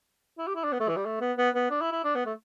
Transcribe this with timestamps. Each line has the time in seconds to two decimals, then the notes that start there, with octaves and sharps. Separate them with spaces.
0.38 E4
0.47 G4
0.55 E4
0.64 D4
0.73 B3
0.80 A3
0.89 E3
0.97 G3
1.05 A3
1.21 B3
1.38 B3
1.55 B3
1.71 D4
1.81 E4
1.92 E4
2.04 D4
2.15 B3
2.26 A3